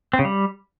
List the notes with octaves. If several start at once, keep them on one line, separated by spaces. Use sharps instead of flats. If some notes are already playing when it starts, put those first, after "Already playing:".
C4
C#3
G3